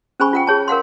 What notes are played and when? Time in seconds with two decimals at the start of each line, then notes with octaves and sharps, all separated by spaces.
0.20 C#4 G#4 C5 G#5 B5 C#6
0.33 F4 F#5 G5
0.47 G#4 C#5 A5
0.68 A#4 F5 F#5 C6